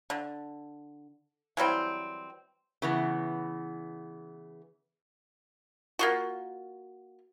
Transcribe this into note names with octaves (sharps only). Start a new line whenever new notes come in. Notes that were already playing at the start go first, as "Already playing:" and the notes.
D3
E3 F#3 G3 C4
C#3 E3 B3
A#3 F4 F#4